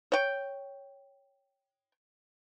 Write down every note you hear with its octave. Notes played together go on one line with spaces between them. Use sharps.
C#5 G5